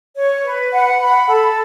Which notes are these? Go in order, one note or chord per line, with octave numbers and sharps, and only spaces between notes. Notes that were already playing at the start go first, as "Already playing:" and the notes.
C#5
B4
F#5
B5
A4